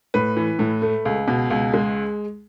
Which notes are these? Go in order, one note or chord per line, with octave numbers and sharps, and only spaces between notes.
A2 B4
E3
A2
A3
C#2
B2
C#2
G#3